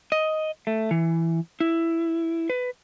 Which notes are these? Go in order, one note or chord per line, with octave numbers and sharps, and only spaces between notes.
D#5
A3
E3
E4
B4